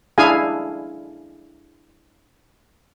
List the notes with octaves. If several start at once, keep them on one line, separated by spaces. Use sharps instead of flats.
D4 E4 G#4 F5 G#5